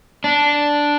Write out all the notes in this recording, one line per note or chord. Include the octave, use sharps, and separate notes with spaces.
D4